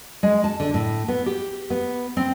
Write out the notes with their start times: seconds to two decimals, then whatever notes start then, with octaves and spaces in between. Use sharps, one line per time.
0.23 G#3
0.44 A5
0.60 D3
0.74 A2
1.08 B3
1.26 G4
1.70 B3
2.17 C4